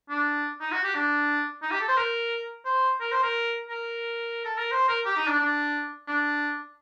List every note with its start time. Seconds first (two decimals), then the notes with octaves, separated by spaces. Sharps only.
0.10 D4
0.60 D#4
0.71 F#4
0.84 G4
0.94 D4
1.63 D#4
1.71 G4
1.81 A4
1.88 C5
1.97 A#4
2.65 C5
3.00 A#4
3.12 C5
3.23 A#4
3.69 A#4
4.45 A4
4.57 A#4
4.71 C5
4.88 A#4
5.06 G4
5.17 D#4
5.27 D4
5.39 D4
6.07 D4